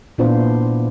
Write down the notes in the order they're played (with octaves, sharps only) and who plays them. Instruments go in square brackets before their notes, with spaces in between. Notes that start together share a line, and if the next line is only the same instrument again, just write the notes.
[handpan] A#2 B3 D4 E4 F4 C5